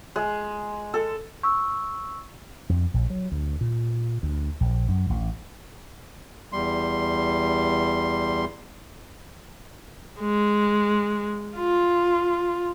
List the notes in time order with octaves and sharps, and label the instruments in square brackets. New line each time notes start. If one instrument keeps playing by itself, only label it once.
[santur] G#3
A4
[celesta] C#6 E6
[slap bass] F2
A#1
F#3
D2
A#2
D2
A#1
F#2
A1
[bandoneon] E2 G3 C6
[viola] G#3
F4